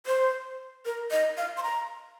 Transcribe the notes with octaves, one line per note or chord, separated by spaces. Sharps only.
C5
A#4
D#5
F5
C6
A#5